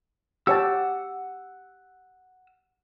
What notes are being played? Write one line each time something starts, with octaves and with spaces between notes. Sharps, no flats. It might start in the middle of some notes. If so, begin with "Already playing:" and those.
G4 C#5 F#5 A5 E6